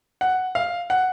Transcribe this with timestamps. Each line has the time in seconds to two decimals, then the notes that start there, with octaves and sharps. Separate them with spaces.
0.21 F#5
0.55 F5
0.90 F#5